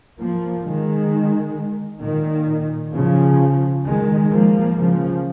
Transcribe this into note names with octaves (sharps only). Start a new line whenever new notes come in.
F3 A#3
D#3 G#3
A#2 D#3
C#3 F3
D#3 G#3
F3 A#3
C#3 F3